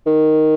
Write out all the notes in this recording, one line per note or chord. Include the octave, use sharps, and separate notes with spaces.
D#3